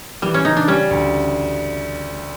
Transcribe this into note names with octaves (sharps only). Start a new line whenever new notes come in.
E3 G3
C#4
C#3 D#4
D4
G3 C#4
D2